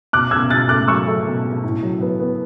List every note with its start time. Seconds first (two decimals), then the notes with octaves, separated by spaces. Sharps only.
0.13 B2 D6 F#6
0.31 B2 E6 G#6
0.50 B2 F#6 A6
0.69 A3 D6 F#6
0.88 F#3 C#6 E6
1.08 A3
1.26 B2
1.45 B2
1.64 A2
1.83 F#3
2.01 B3
2.20 B3